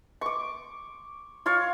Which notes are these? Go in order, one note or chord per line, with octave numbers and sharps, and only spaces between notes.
C#6 D6
F4 C#5 F5